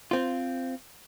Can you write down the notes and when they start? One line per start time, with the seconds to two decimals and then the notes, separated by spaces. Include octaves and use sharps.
0.11 C4 F4